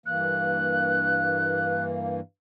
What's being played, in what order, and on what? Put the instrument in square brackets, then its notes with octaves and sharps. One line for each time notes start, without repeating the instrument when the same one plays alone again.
[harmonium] G2 E3 A#3 [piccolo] F#6